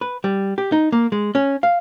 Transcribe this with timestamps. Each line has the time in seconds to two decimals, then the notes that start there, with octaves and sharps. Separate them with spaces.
0.01 B4
0.24 G3
0.58 G4
0.72 D#4
0.92 A#3
1.12 G#3
1.35 C#4
1.63 F5